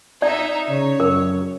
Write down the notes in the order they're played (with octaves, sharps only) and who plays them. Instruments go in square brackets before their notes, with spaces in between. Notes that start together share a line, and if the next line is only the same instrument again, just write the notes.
[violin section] D#4 E5 [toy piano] D5
[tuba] C#3 [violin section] C#5
[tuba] F#2 [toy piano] A#4